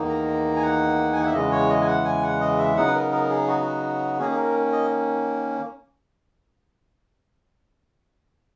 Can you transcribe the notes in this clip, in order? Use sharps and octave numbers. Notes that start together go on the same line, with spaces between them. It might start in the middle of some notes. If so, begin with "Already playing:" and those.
Already playing: E2 D#3 A#3 D#4
A#5
G#5
F#5
G#5
F#5
E5
E2 C#3 E3 G#3 D#5
C#5
D#5
G#5
F#5
G#5
F#5
D#5
E5
C#3 F#3 B3 D#4 F#5
B4
A#4
A#4
G#4
F#4
F#4
D#3 A#3 C#4 G#4
G#4
A#4
D#5